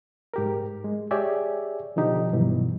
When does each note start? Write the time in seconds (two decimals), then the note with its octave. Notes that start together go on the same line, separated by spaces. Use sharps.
0.34 G#2 G4 A#4
0.84 G#3
1.11 G4 G#4 C#5 D5 E5 G#5
1.96 B2 D3 F3 D#4 G4
2.32 G2 B2 D#3 E3 F#3 G3